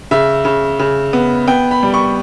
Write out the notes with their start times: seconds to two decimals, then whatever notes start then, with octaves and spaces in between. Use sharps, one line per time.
0.11 C#3 E5
0.45 C#3
0.79 C#3
1.13 B3
1.47 B3 G5
1.71 B5
1.83 G3
1.94 C#6